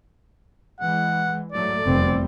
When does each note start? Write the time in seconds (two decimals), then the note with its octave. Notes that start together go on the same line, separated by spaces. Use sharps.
0.80 E3 G#3 F#5
1.52 G#2 F#3 A3 D5
1.85 F1 E2 C3 G3 C4